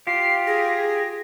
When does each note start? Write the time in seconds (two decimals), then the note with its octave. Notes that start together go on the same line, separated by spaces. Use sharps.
0.07 F4 G4 C7
0.47 G#4 A#6